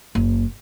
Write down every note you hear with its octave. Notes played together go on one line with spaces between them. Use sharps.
F#1